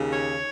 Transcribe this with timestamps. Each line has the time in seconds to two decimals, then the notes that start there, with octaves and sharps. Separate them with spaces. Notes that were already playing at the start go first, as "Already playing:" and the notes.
Already playing: D#2 C#3
0.09 C#5